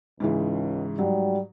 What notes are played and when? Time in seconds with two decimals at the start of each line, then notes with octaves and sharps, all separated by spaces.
0.20 C#2 G#2 C#3 E3
0.99 G#2 F#3 G3